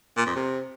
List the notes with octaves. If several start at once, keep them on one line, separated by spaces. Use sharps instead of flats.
A#2
F2
C3